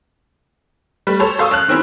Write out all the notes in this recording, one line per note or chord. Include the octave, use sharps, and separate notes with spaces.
G3 A3 B4
A4 C5 C#5
A4 C5 F5 C#6 D#6 E6
A1 A5 F6 F#6
D#3 C4 C#4 E4